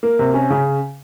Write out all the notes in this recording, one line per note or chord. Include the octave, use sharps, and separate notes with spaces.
A#3
C3
C#4
C#3